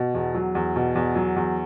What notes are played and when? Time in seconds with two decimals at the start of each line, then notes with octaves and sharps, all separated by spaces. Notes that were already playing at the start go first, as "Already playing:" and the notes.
Already playing: B2
0.14 E2
0.34 F#3
0.55 E2
0.76 B2
0.95 E2
1.15 F#3
1.36 E2